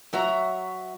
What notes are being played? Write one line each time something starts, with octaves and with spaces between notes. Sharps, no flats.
F#3 F#4 E5 A#5